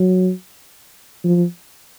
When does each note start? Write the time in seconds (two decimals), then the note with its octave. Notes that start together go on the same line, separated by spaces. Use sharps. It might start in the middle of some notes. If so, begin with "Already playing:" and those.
Already playing: F#3
1.24 F3